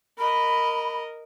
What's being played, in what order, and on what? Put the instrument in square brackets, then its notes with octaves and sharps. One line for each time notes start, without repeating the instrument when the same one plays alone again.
[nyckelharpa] A#4 D#5 [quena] B5